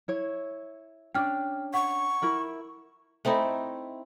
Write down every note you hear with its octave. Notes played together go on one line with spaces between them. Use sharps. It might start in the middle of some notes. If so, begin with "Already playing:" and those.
E4 C#5
C#4 D4 G5 F6
F#5 C#6
E4 A#4 B5
A3 C4 D#4 E4